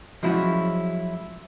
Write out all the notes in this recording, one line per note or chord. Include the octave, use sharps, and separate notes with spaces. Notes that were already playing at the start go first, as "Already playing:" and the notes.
F3 F#3 G#3 C#4 E4 F#4